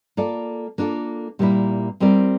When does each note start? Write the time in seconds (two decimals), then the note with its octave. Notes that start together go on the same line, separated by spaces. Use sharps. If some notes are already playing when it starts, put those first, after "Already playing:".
0.17 A#3 F4 A4 D5
0.78 A#3 D4 F4 A4
1.39 A#2 G3 A#3 E4
2.00 G3 C4 E4 A#4 D5